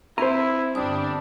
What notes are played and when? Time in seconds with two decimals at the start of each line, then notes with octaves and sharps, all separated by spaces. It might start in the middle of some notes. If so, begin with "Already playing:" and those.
0.18 C4 E4 C5 A#5
0.75 G1 G3 D4 D#6